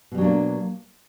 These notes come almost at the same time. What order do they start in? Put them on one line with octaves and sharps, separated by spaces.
B2 G3 F#3 D4 A#3